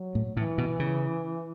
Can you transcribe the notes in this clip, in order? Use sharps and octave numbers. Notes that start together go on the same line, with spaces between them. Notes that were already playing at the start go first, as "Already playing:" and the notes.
Already playing: F#3
A2
A2 E3
B2
C#3